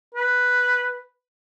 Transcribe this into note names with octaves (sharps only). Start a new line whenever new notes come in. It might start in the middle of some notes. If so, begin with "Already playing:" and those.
B4